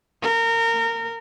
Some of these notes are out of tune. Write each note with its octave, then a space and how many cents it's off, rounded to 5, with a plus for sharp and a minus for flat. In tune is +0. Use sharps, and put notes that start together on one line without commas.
A#4 -25